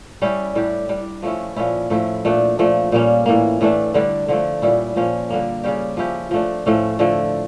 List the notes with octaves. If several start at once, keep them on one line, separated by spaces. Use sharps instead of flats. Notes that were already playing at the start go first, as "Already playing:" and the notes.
G3 C#4 E4 G4
A2 G3 D4 G4
G3 D4 G4
F3 A3 C#4 E4
A#2 F3 C#4 E4
A2 F3 A3 E4
A#2 A3 D4
A#2 F3 A3
A#2 G3 A#3 C#4
A2 E3 A#3
A2 E3 A3 D4
D3 G3 D4
D3 F3 A3
A#2 G3 C#4 E4
A#2 F3 A#3 C#4
D3 G3 A#3
C#3 G3 C#4 G4
F3 C#4 E4 G4
F3 A3 D4
A2 F3 A3 C#4
D3 F3 A3